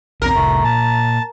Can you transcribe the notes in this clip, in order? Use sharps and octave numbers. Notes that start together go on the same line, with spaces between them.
B1 E2 C4 A#4
F1 C2 A3
A#2 A5